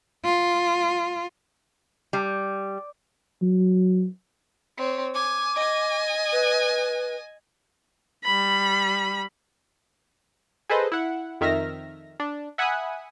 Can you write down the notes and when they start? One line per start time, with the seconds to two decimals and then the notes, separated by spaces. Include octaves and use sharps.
0.24 F4
2.13 G3
3.42 F#3
4.77 C4 C#5
5.14 G#5 D6
5.56 D#5 G#5
6.32 B4
8.24 G3 B5
10.69 G#4 A4 B4 C5 D#5
10.92 E4 F#5
11.41 F2 D#3 E5 F6 A#6
12.20 D4
12.58 E5 F#5 G#5 B5 D#6 F#6